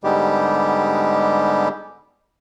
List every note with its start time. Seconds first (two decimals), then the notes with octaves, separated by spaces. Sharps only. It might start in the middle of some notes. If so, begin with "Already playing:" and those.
0.04 G#2 D3 G3 G#3 B3 G4